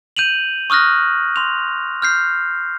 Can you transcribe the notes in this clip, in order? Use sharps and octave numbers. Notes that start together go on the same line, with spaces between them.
G6 D#7 F7 F#7
C#6 D#6 F6 F#6 A#6
C6 F7
F6 G6 C7